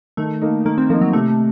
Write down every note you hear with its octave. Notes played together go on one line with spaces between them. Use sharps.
D#3 A3
A#3 D#4
D#3 A#3
C4
F3 A#3 D#4
F#3
C3 A3